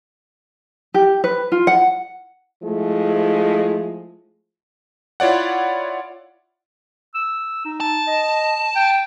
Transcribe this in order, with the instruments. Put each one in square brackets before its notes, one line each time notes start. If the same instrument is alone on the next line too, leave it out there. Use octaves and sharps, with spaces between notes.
[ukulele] G4
B4
F4
F#5
[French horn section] F3 G#3 A3 E4
[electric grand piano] E4 F4 C#5 D5 F#5
[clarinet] E6
D#4
[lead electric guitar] A5
[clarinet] D#5
G5